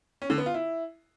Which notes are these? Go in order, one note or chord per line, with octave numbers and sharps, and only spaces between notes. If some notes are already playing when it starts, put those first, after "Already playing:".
C#4
D3
B3
F4
E4